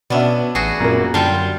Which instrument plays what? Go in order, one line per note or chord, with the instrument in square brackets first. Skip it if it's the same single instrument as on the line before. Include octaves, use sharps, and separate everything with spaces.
[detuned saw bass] B2 [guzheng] B3 C#4 D4 [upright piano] D5 E5
[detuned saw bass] A1 [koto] F#4 G#4
[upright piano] F#2 A#3 [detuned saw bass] A#2
[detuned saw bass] F#2 [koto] D3 G3 [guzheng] F4 G5 [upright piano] A5